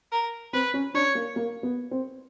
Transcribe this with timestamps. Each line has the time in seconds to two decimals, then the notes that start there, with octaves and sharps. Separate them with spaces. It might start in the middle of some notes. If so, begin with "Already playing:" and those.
0.12 A#4
0.53 C4 B4
0.74 C#4
0.94 D4 C#5
1.15 A#3
1.36 A#3
1.63 B3
1.91 C4